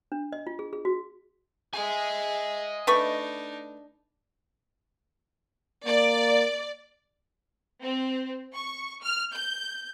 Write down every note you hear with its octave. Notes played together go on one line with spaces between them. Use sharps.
D4
D#5
F4
G#4
G#4
F#4
G#4 D#5 E5 G#5
A3 D4 D#4 B4 C#6
A#3 D5
C4
C#6
F6
G6